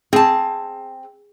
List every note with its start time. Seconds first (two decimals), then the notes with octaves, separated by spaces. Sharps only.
0.13 C4 G#4 A5